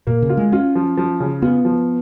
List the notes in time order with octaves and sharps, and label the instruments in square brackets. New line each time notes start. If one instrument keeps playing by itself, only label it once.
[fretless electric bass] A#2 [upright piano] A#3
[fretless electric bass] C#3
[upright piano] F4
[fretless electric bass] G#3
[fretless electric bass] C#4 [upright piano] F4
[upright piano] F3
F3
C#3
[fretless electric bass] B3 [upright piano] F4
[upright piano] F3